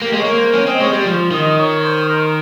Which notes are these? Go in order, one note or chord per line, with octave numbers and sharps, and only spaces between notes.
A#3 G4
G#3
C#5
A#3
C5
C#4 A#4
C4 D#5
G#3 C#5
G3 C5
F3
D#3 D#5
C#5
C5
A#4